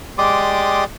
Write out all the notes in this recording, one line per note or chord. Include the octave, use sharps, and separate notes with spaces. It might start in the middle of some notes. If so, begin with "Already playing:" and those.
G#3 G4 D5 C6 D6 D#6